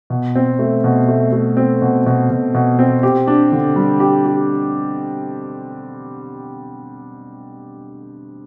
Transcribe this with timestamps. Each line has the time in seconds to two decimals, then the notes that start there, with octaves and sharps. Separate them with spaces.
0.10 B2
0.35 C4
0.59 A3
0.84 B2
1.08 A3
1.33 A3
1.57 C4
1.82 B2
2.06 B2
2.30 B2
2.54 B2
2.79 C4
3.03 G4
3.27 D4
3.52 D3
3.76 G3
4.00 G4
4.25 G4